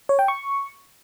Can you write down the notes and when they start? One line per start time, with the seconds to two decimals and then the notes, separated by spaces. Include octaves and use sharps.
0.09 C#5
0.19 G5
0.28 C#6